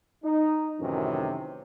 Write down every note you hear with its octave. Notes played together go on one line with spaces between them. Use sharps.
D#4
F#2 A2 C3 D#3 E3 C#4